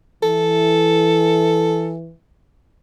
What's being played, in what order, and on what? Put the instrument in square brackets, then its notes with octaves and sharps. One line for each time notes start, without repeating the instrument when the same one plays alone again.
[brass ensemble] E3 [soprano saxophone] A4